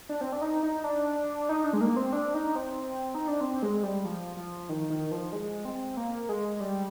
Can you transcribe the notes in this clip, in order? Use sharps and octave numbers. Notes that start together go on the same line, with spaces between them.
D4
C4
D4
D#4
D#4
D4
D#4
D4
G#3
A#3
C4
D4
D#4
C4
D#4
D4
C4
G#3
G3
F3
F3
D#3
D#3
F3
G#3
C4
A#3
G#3
G3